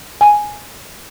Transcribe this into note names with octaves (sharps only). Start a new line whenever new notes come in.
G#5